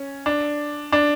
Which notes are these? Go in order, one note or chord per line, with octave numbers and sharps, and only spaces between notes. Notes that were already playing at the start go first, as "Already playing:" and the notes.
Already playing: C#4
D4
D4